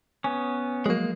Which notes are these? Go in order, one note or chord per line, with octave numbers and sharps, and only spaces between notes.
B3 C#4 G#5
F3 F#3 G#3 A#3 F#4